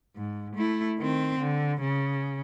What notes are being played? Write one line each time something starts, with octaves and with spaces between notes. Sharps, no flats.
G#2
A3 E4
D#3 C4
D3
C#3